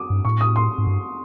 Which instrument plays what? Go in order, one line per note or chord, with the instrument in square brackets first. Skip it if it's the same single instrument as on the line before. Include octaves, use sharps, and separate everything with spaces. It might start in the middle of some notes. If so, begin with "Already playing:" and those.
Already playing: [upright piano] D6 D#6
[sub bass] G2
[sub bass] A2 [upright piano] C#6
[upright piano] D#6
C6
[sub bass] G#2
G2